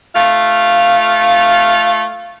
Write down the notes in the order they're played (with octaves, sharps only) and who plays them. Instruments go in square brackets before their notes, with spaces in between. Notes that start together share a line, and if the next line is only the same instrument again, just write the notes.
[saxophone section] A3 F4 F5